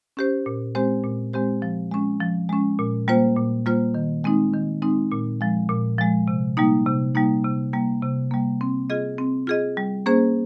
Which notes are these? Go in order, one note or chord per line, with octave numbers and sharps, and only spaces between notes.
C#4 G4 C5
A#2
G#3 C4 G4 C5
A#2
G#3 C4 G4 C5
F3
G#3 C#4
F3
G#3 C#4
A#2
G3 A#3 F4 C5
A#2
G3 A#3 F4 C5
D#3
G#3 C4 D#4
D#3
G#3 C4 D#4
A#2
F3 G#3
A#2
F3 G#3
C3
G3 A#3 D#4
C3
G3 A#3 D#4
C3
G3 A#3
C3
G3 A#3
C4
F4 G#4 D#5
C4
F4 G#4 D#5
G3
A#3 C#4 G#4 C5